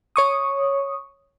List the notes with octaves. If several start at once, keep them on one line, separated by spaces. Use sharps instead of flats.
C#5 C#6 D#6